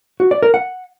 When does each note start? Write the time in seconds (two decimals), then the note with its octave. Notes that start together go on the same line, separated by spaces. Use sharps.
0.20 F#4
0.31 D5
0.43 A#4
0.54 F#5